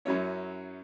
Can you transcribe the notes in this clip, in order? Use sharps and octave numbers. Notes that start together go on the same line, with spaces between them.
F#2 F#3 C#4 E4 C#5